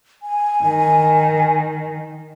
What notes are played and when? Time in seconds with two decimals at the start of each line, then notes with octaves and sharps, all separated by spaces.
0.23 G#5
0.64 D#3